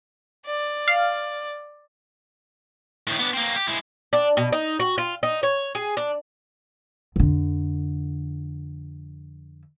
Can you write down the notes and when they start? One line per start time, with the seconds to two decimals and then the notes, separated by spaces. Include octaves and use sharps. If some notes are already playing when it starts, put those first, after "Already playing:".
0.46 D5
0.88 F5
3.07 A2 D#3
3.19 B3 D4
3.33 A#3 C4
3.56 G4
3.68 G#3 E4
4.13 D4
4.37 B2
4.52 D#4
4.80 F#4
4.98 F4
5.23 D#4
5.43 C#5
5.75 G#4
5.97 D4
7.16 F2 D3